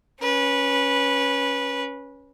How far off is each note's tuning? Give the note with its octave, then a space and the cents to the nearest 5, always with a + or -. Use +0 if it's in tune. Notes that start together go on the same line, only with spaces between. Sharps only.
C#4 +0 B4 -20